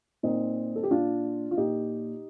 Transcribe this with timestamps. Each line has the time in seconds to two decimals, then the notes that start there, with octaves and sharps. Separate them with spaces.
0.23 A#2 C4 D#4
0.76 A4
0.83 G4
0.91 A#2 D4 F4
1.51 F4
1.57 A#2 D#4 G4